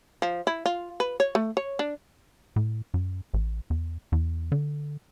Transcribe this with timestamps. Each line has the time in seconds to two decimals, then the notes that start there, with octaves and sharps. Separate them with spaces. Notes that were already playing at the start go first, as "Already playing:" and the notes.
0.22 F3
0.47 E4
0.66 F4
1.00 B4
1.20 C#5
1.35 A3
1.57 C#5
1.79 D4
2.56 A2
2.94 F#2
3.34 A1
3.70 E2
4.12 E2
4.52 D3